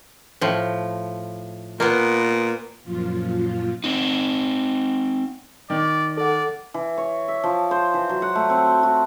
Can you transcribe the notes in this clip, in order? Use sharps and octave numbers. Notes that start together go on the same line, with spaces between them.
A2 F3
A#2 A#3 B3
F#2 A#2 F3 F4
C4 D#4
D#3 D5
A4 D5 F#5
E3
C#5
E5
F3
C5
E3
F#3
F#5
A3
C4
F#4